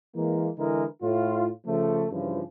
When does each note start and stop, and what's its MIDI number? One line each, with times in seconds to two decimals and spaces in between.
0.15 0.49 52
0.15 0.49 56
0.15 0.49 58
0.57 0.84 50
0.57 0.84 52
0.57 0.84 56
0.57 0.84 64
0.57 0.84 70
1.02 1.49 45
1.02 1.49 65
1.67 2.06 49
1.67 2.06 53
1.67 2.06 57
2.11 2.41 43
2.11 2.41 49
2.11 2.41 52
2.11 2.41 53